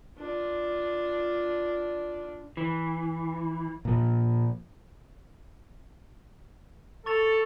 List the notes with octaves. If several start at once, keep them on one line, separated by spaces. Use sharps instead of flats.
D4 F4
E3
A#2 F3
A4 C#6 A6 F7